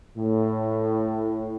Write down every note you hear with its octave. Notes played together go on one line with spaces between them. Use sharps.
A2